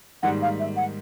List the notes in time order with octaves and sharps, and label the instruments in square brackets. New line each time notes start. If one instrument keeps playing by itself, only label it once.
[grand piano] G#2 D#3 G3 A#3 [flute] F#5
[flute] F5
E5
F#5